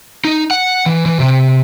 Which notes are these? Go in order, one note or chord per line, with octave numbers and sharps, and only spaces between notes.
D#4
F#5
E3
E3
C3